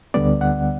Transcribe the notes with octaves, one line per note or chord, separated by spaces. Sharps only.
D2 D3 G3 B3 D5
F#5